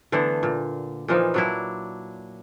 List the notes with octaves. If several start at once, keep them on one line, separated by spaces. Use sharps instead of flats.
D3 E3 A3 B3
A#2
A#2 E3 F3 D#4
F#3 D4 E4